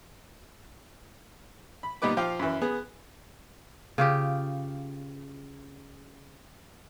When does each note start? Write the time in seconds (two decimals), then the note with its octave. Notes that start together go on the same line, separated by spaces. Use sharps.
1.83 B5
2.02 A#2 G3 B3 D#4 B4 D6
2.17 F3 F5 G5 D6
2.39 F#2 E3
2.62 B3 G#4
3.98 C#3 F4 G4